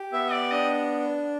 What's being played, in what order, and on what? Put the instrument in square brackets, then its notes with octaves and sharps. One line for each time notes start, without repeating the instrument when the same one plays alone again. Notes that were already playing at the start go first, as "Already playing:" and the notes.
Already playing: [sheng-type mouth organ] G4
[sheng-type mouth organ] B3 [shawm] E5
[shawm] D5
[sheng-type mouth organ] D4 [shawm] D#5